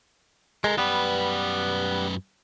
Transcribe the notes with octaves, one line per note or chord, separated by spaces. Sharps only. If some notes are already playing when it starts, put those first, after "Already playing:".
G#3 A4 A#4
F#2 G3 B3 B4